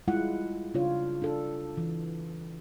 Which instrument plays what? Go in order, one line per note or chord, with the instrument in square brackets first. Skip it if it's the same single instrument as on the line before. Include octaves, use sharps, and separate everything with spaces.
[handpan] G3 G#3 E4 F4 F#5
C#3 D4 F4 C#5
D4 A4
E3